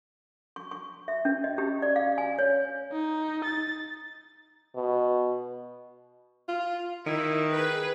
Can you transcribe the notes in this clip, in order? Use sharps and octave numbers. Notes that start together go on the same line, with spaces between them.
C#6
C#6
E5
C#4
D#5
G4
D5
F5
G#5
C#5
D#4
A6
B2
F4
D#3 E4
G#4 B4